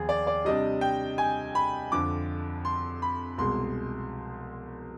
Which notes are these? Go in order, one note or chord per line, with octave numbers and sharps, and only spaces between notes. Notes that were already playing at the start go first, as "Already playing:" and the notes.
Already playing: D#2 F3 B3 G#4
D5
D5
C3 G3 D4 D#5
G5
G#5
B5
F2 D3 F3 D6
C6
B5
C2 B2 G#3 C6